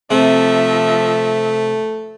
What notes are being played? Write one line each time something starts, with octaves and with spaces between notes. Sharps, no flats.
C3 F3 A3 E5